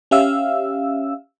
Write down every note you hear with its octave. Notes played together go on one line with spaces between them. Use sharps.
C#4 G4 E5 F5 E6